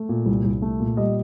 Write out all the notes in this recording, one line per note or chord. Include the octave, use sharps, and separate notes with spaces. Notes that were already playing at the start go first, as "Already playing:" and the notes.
Already playing: A3
A#2
C2
C2
A3
A#2
G3 D#5